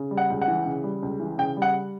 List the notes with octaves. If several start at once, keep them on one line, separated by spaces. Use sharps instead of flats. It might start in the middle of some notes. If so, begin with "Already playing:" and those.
Already playing: C#3
G3
F#5
C#2
F#5
E3
C#3
G3
C#2
E3
C#3 G5
G3
F#5